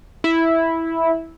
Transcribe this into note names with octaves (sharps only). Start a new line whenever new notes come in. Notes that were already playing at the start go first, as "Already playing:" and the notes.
E4